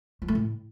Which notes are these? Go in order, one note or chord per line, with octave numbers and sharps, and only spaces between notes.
F3
A3
A2